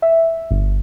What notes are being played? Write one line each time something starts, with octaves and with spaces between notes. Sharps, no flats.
E5
G1